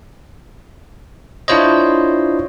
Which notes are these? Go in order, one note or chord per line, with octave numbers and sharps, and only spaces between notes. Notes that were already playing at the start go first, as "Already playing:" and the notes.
D4 E4 F4 C5 C#5 D#5